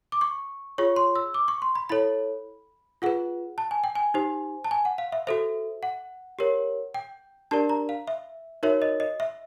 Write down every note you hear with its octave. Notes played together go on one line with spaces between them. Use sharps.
D6
C#6
F4 G#4 C#5 C#6
C6
E6
D6
C#6
C6
B5
E4 A4 C#5 B5
F4 G#4 B4 F#5
A5
G#5
G5
G#5
D#4 G4 C5
A5
G#5
F#5
F5
E5
F#4 A4 C5 E5
F#5
G4 A#4 C#5
G5
D4 G4 A#4 D5 A5
A#5
F5
E5
D#4 F#4 A#4 C#5 E5
D#5
D#5
E5